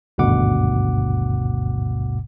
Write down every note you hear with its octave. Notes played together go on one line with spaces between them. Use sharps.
G#1 D2 G2 B2 F#5 D6